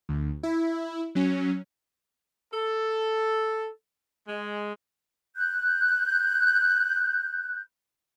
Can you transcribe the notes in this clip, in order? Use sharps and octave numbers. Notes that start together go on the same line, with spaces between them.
D2
E4
F#3 C#4
A4
G#3
F#6 G6